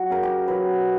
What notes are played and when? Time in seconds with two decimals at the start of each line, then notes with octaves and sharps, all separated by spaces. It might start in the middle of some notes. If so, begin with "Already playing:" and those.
Already playing: F#3
0.10 C#3 A#4
0.23 G4
0.48 F#3 B4